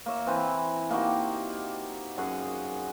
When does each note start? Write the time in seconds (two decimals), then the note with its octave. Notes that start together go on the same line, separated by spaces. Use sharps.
0.06 A#3 C#5 E5
0.27 E3 C4 B4 A#5
0.90 A#3 D#4 F#4 G4
2.18 F#2 G#4 D#5 F#5